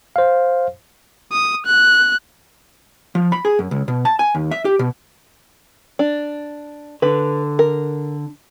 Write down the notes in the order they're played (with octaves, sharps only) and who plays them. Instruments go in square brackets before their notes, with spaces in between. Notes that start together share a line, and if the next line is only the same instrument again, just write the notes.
[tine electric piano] C5 F5
[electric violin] D#6
F#6
[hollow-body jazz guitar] F3
B5
G#4
F#2
C#2
B2
A5
G#5
D#2
E5
G4
B2
[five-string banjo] D4
[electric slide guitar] D3 [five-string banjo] B4
[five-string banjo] A#4